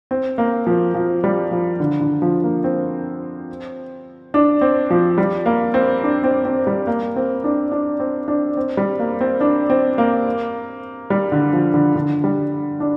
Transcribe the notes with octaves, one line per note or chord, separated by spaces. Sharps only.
C4
A#3
F3
F3
G3
F3
D3
D3
F3
A#3
C4
D4
C4
F3
G3
A#3
C4
D4
C4
C4
G3
A#3
C4
D4
D4
C4
D4
C4
G3
A#3
C4
D4
C4
A#3
G3
D3
F3
D3
D3
G3
D4